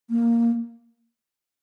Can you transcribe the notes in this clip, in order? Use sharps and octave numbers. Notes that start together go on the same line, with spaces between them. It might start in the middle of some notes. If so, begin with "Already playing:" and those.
A#3